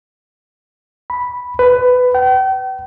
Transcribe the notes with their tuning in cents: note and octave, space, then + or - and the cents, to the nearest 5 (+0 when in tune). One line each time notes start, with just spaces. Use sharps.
B5 -5
B4 +15
G5 -40